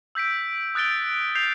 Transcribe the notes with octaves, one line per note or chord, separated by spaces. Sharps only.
E6 G6 B6 D7
D#6 F#6 A6 D7 G7
G6 C7 F7